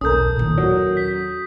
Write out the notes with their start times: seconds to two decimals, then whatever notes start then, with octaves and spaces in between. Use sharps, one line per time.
0.01 B1 E2 C#4 A4 A#4 D#6 G6
0.36 A#2 D#3
0.58 D#2 F#3
0.97 B6